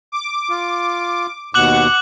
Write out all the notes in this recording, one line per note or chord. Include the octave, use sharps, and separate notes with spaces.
D6
F4
D#2 B2 F#5 D6 F#6 F#7